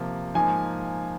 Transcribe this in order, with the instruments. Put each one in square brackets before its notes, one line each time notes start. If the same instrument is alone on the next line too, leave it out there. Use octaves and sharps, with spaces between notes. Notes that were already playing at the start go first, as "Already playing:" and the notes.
Already playing: [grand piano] C3 F3 A#3
[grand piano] G#2 F3 A#3 [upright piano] G#5